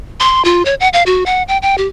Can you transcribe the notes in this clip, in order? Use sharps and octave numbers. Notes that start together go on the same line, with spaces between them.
C6
F4
C#5
F#5
F5
F#4
F#5
G5
G5
G4